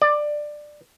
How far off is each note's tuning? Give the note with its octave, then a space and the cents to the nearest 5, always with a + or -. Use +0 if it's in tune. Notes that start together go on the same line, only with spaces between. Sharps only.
D5 +15